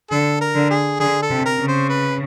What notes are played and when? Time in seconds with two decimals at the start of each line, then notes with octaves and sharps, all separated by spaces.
0.11 D3 A4
0.41 A#4
0.55 D3
0.70 G#4
1.00 D3 G#4
1.22 A4
1.30 C3
1.45 A#4
1.60 C#3
1.68 C5
1.89 B4